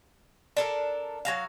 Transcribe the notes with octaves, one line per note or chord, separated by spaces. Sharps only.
D4 A4 A#4
F#3 F#4 F5